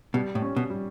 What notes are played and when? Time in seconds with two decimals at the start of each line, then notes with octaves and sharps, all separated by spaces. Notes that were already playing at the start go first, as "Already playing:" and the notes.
0.14 B2 G3
0.35 A2
0.42 C#4
0.56 B2
0.70 G3